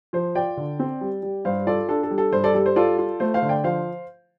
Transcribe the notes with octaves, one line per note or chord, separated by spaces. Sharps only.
F3 C5
F4 D5 G5
D3
C4
G3
G3
G2 C5 F5
F4 A4 D5
D4 A4
A4
G3
A4
G2 C5
A4 D5
G3 A4
C5
F4 A4 D5
F4
A3 C5
C5 F5
D3
D5 G5
F3 C5 F5